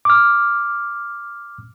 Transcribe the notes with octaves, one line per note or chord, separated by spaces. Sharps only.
D6 F6